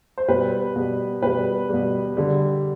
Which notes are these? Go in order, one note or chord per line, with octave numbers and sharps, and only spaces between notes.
C5
B2 G3 B4
B2 G3
B2 G3 B4
B2 G3
D3 G3